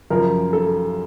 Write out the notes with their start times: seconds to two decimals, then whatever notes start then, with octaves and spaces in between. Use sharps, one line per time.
0.10 F#2 C#3 F3 A#4
0.53 A4